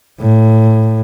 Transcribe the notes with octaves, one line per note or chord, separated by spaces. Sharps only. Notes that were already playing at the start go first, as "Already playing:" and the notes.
A2